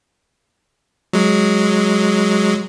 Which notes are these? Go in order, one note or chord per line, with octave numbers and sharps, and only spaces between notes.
F#3 G#3